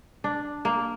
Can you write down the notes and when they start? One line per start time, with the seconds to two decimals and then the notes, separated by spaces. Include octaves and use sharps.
0.24 D4
0.65 A#3